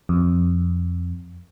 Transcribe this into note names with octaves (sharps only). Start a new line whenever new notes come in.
F2